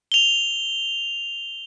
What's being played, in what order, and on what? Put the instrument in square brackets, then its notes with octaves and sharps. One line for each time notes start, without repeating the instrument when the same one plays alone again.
[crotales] F7 G7